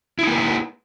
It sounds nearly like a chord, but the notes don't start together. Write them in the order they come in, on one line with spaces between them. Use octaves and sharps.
E4 D#4 A#3 B4